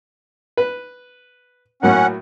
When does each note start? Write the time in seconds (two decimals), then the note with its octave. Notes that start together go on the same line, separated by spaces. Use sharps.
0.57 B4
1.83 A2 F#3 A#3 C#4 F#5